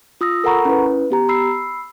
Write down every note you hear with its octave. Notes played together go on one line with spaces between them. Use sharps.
F4 D#6 E6 A#6
A4 A#4 F#5 A#5 B5 C#6
C#4 E4 B4
B3 G4 A#5
B5 E6 C7